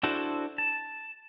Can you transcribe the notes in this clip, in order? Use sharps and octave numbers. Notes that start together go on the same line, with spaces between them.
D4 E4 F#4 A4 C5
A5